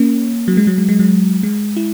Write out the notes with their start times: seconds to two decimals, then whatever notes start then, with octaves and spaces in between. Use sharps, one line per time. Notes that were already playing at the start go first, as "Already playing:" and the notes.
Already playing: A#3 C#4
0.48 F#3
0.57 G#3
0.67 F#3
0.78 G#3
0.89 G#3
0.99 F#3
1.43 G#3
1.76 E4